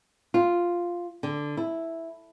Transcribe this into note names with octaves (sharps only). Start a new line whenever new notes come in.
F4
D3
E4